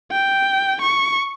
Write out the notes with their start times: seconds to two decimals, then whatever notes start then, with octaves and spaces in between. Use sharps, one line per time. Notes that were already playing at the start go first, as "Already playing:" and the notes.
0.11 G5
0.82 C#6